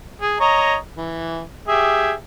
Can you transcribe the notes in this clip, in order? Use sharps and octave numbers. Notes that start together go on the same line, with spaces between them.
G#4
C#5 D#5 A#5
E3
G4 G#4 E5